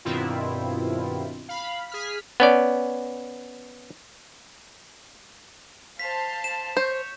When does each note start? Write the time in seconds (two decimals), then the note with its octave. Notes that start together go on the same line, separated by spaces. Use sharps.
0.05 G2 B2 D#3 C4 E4 F4
1.49 F5 B5
1.89 G#4 F6 B6
2.40 B3 C#4 D5
5.99 C5 F5 A5 B6
6.44 E7
6.77 C5 C#5 G6